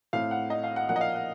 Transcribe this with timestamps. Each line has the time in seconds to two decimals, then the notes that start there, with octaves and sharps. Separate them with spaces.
0.13 A2 A3 C4 F5
0.31 F#5
0.50 D#5
0.64 F5
0.76 F#5
0.89 A#2 F3 A#3 F#5
0.96 D#5
1.01 F5
1.15 F#5